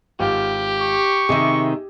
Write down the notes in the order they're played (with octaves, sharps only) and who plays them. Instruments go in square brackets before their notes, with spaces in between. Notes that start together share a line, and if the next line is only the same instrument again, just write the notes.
[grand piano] G#1 F4 G5 [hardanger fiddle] G4
[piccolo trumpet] C#6
[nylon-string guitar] C3 D#3 [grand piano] G#4 D#5 E5